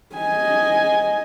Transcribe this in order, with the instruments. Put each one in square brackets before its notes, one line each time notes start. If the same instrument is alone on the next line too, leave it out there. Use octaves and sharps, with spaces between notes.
[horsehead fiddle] D#5 G#5